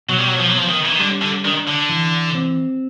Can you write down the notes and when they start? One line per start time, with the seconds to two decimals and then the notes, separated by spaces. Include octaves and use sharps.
0.08 B2 F#3
0.18 G3
0.27 F#3
0.39 F3
0.49 F#3
0.54 F3 B3
0.69 D#3
0.85 E3
0.92 D#3
0.99 D3 G3
1.22 D3
1.44 D#3 D4
1.67 D3
1.89 E3
2.35 C4